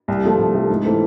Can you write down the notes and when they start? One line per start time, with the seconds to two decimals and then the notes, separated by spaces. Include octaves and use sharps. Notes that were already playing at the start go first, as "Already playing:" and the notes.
0.08 C2
0.24 C3 F3 A3
0.38 C2
0.54 C3 F3 A3
0.70 G#2
0.85 E3 A3 C4